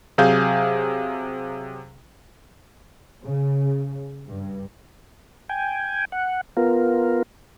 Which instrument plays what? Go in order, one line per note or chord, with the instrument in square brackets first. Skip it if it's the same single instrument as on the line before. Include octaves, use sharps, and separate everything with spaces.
[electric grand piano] C3 F#3 G#4 F5 G6
[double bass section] C#3
G2
[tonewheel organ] G5 G#5
F#5
B3 F4 A#4